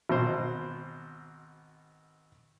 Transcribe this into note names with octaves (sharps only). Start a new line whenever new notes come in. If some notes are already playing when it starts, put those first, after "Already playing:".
G#1 B2 C5